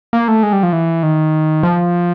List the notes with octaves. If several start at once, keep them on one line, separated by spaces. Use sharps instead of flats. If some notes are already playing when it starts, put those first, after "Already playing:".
A#3
A3
G#3
G3
F3
E3
D#3
F3